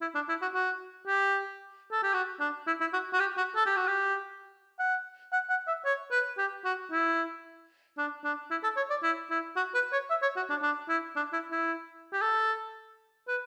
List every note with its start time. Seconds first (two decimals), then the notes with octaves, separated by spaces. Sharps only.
0.01 E4
0.15 D4
0.29 E4
0.42 F#4
0.54 F#4
1.07 G4
1.92 A4
2.03 G4
2.14 F#4
2.40 D4
2.67 E4
2.81 E4
2.93 F#4
3.13 F#4
3.20 G4
3.37 F#4
3.56 A4
3.66 G4
3.77 F#4
3.87 G4
4.79 F#5
5.33 F#5
5.50 F#5
5.67 E5
5.85 C#5
6.11 B4
6.38 G4
6.65 F#4
6.91 E4
7.98 D4
8.24 D4
8.51 E4
8.63 A4
8.77 C#5
8.90 D5
9.03 E4
9.30 E4
9.56 F#4
9.74 B4
9.92 C#5
10.10 E5
10.22 C#5
10.36 F#4
10.50 D4
10.62 D4
10.89 E4
11.16 D4
11.33 E4
11.51 E4
12.13 G4
12.21 A4
13.28 B4